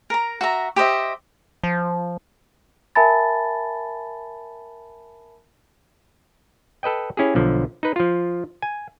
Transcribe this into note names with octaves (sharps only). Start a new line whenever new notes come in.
A#4 A#5
F#4 E5 A#5
G4 C5 D#5 E5
F3
A#4 E5 G#5 A5 B5 A6
A4 B4 D#5 G5
C#4 E4 G4 G#4
B1 D3 F3
D#4 B4
F3 F4
G#5